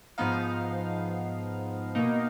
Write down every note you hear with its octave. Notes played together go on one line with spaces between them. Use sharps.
G#2 F3 B3 D#4 F5
B2 A#3 D#4